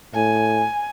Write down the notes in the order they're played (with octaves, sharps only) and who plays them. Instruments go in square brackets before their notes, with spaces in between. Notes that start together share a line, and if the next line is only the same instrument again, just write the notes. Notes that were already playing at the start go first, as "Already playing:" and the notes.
[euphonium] A2 [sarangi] G#5